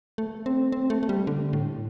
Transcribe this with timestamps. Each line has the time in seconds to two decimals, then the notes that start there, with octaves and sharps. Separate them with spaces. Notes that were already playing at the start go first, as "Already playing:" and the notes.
0.18 A3
0.46 C4
0.72 C4
0.90 A3
1.03 A3
1.09 G3
1.27 D3
1.53 A2